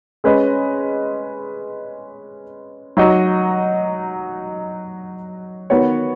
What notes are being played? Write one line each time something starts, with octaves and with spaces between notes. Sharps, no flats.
G#3 C#4 B4 D#5
F#3 D#4 F#4 D#5
D#3 B3 F#4 C#5